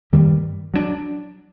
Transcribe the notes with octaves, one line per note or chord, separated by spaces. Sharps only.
G2 D#3 G3 A#3
F#3 A#3 D4